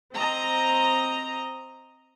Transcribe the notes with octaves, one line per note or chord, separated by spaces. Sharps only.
C4 D#5 A#5